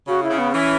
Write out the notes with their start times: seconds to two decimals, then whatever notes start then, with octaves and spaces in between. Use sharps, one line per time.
0.07 C#3 F#4
0.23 E4
0.30 C#3
0.38 B3
0.53 E3 C#4